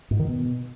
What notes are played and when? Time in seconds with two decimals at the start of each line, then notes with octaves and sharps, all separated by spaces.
0.11 G#2
0.19 D#3
0.28 B2